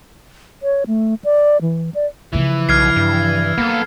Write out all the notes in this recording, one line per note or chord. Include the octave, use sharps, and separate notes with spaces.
C#5
A3
D5
E3
D5
C#3 E3 F3
B1 F6 G#6 C7
G2
F#3 A#3 B3 A4